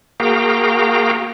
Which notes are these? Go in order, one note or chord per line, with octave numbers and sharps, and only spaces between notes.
A#3 F#4 G#4 F5 G5 A#5